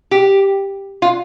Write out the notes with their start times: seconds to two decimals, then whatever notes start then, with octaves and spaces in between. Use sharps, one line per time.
0.11 G4
1.02 F4